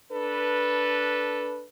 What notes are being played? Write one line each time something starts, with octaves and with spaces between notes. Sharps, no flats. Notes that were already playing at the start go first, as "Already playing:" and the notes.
D4 A4 B4